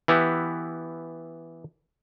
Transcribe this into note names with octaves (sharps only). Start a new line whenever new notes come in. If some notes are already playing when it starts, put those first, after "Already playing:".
E3 B3 E4 G4